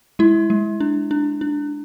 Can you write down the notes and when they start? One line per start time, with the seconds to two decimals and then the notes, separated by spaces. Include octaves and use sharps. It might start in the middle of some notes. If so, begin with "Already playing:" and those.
0.19 G#3 E4
0.50 G#3
0.80 D4
1.11 D4
1.41 D4